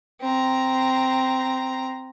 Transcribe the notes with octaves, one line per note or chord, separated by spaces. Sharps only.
C4 A#5